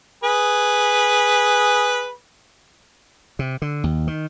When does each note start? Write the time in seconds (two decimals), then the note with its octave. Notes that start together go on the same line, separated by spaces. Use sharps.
0.24 G#4 B4
3.39 C3
3.62 D3
3.84 D#2
4.07 D#3